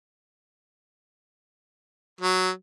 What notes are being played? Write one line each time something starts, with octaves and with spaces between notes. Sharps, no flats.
F#3